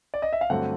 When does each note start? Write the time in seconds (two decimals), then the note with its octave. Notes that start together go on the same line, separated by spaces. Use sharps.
0.14 D5
0.22 D#5
0.33 E5
0.41 F5
0.50 G2 D3 F#3 A3 C4 F#5